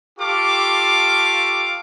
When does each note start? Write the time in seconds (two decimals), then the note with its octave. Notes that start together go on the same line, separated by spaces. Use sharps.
0.19 F4 G4 A4 F5 C#6 D6